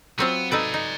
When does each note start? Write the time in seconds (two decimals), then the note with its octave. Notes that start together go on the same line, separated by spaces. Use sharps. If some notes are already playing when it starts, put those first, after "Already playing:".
0.19 F#3 B3 C4 F4
0.52 D#4 A4 B4 D5 G#5
0.74 D#4